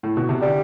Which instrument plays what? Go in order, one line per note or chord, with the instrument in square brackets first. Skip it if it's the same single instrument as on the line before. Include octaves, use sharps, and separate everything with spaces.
[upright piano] A2
B2
C3
[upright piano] D3 [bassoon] G3